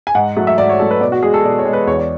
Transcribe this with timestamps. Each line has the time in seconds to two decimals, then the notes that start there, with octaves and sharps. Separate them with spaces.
0.07 G#5
0.15 G#2 F#5
0.37 F#3 A3
0.47 E5
0.58 G#2 D5
0.69 C#5
0.79 F#3 A3 A4
0.91 B4
1.01 B2 D5
1.12 F#4
1.23 G#3 G#4
1.34 A4
1.44 B2 D5
1.59 C#5
1.65 G#3
1.73 B4
1.87 E2 C#5
1.98 D5